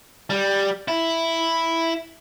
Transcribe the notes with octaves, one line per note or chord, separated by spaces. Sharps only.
G3
E4